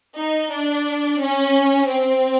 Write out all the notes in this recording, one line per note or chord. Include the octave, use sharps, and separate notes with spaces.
D#4
D4
C#4
C4